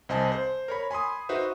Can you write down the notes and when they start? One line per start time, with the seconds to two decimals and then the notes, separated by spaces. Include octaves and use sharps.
0.09 C2 C5 D#5 G#5 A5
0.32 C5
0.68 A#4 C#5 B5
0.91 G#5 B5 C6 D#6
1.29 D#4 F#4 B4 C5 E5